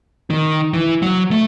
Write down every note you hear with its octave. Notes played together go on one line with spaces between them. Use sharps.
D#3
E3
F#3
A3